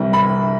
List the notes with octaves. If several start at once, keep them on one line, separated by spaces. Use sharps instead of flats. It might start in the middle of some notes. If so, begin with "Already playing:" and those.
Already playing: C2 C3 E3 G3
B5